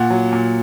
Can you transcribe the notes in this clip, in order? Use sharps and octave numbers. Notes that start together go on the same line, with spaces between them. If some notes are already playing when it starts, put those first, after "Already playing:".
Already playing: A#2 F#5
F#3
A#2